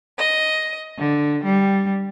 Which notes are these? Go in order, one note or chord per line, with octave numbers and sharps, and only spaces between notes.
D#5
D3
G3